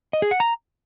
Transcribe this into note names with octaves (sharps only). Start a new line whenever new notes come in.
D#5
G#4
F#5
A#5